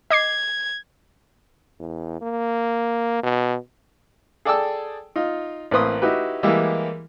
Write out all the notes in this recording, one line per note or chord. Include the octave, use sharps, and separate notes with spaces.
D#5 D6 G#6 C7
E2
A#3
B2
G#4 A4 D5 G5 A5 E6
D#4 F4
A1 A#3 C4 B4 C6 D#6
D#4 E4 F#4 G4 B4
E3 G3 G#3 A#3 E4 G4